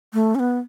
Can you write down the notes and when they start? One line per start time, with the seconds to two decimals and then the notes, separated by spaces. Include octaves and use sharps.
0.14 A3
0.35 C#4
0.39 B3